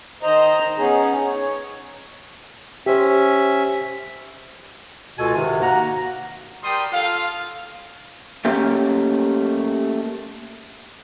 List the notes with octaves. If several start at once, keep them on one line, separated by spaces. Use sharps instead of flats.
D#3 C5 D#5 A#5
B3 C#4 D#4 G#4
C#5
C#4 G4 C5 E5
C#2 B2 F4 F#4 A4 G#5
G#2 C3 D#3
A#3 F#4 F#5 A#5
G3 A#4 G5 C6 D#6
F4 A4 F5
A3 A#3 C#4 G4